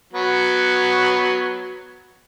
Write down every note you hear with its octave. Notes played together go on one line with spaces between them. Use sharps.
F#3 B3